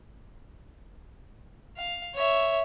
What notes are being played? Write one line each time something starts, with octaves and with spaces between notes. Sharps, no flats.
F5
C#5 E5